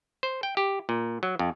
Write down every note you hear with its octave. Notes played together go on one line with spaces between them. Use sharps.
C5
G5
G4
A#2
F#3
F2